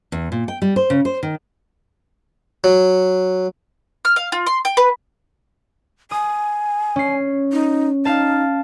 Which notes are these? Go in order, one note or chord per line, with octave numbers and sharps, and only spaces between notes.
E2
A#2
G5
G3
C5
C#3
C5
D#3
F#3
F6
F5
F4
C6
G5
B4
G#5 D#6
C#4 C7
D#4
D#4 F5 A5